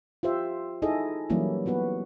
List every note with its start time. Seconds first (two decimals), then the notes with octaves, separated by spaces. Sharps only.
0.23 F4 G4 C5 E5
0.82 D#4 E4 G#4 A4 D#5
1.30 E3 F#3 G3 A#3 C#4 E4
1.66 F#3 B3 F#4 B4